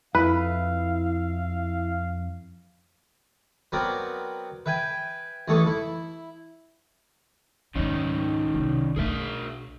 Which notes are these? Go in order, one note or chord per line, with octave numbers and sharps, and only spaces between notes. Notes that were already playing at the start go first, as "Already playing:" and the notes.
F2 E4 B4 F5
F#3 B3 C4 A#4 D5
B4 E5 G5 G#5
A1 E3 A3 G#4 A4 C#6
E4
C#2 G#2 D#3 C#4 D#4
C2
B1 D4 G#4 A#4 E5